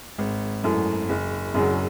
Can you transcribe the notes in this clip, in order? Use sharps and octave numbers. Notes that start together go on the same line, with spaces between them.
G#1
F#2 E3 A3
F#1
F#2 C#3 F#3